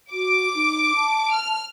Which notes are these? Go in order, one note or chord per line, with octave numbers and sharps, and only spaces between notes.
F#4 D6
D#4
A5
F6